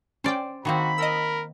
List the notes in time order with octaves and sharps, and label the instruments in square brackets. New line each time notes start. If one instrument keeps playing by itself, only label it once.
[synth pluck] C#4 G5 [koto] C5 D5
[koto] D#3 A#3 C4 [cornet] F#4 [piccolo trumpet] B5
[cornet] A#4 [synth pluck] D#5 E6